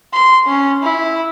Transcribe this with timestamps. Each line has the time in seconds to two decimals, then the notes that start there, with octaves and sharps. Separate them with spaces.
0.13 C6
0.48 C#4
0.83 E4